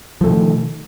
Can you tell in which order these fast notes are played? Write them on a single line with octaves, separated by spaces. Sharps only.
F3 A3 B2 D#3